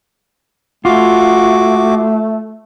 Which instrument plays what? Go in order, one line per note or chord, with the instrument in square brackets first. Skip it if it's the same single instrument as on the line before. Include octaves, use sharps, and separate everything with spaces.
[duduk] A3 [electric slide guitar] F4 [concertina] F#4 D6